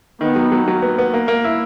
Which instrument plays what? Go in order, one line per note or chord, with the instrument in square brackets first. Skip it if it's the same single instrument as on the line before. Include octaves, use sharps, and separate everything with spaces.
[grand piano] D#3 [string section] B3
[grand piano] F#3
F#3
[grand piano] F#3 [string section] A#3
[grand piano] B3
B3
A#3
A#3
E4